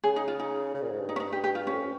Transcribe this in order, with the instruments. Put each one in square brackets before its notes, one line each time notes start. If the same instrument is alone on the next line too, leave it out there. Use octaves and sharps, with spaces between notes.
[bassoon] C#3 [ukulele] G#4
[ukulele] D#4
F4
D#4
[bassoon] C#3
A#2
G#2
G2
[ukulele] D#4
C#4
D#4
G4
G4
F4
C#4
[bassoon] F2